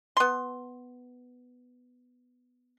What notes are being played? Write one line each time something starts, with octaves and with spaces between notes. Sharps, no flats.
B3 C6